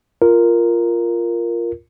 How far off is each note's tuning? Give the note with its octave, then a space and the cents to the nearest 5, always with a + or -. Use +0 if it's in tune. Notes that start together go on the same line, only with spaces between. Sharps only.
F4 -10 A#4 +0